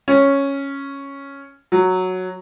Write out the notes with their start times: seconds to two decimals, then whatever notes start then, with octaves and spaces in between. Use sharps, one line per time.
0.08 C#4
1.72 F#3